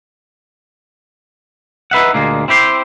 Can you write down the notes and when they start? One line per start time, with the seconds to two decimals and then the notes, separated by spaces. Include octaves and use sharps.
1.91 D#4 B4 E5 F#5
2.14 D2 A#2 G#3 A#3
2.48 C4 E4 G4 C5